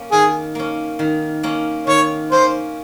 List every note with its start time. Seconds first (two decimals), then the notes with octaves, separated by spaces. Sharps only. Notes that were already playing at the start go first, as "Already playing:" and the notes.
Already playing: A#3 C#4
0.12 D#3 G#4
0.55 A#3 C#4
0.99 D#3
1.43 A#3 C#4
1.87 D#3 C#5
2.32 A#3 C#4 C5